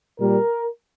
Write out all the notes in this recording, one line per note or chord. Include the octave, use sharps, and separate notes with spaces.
A#2 G3 A#4